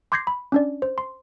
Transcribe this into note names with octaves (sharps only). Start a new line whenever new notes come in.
C6 D6 G6 G#6 A#6 C7
B5
C#4 D4 D5
C5
C6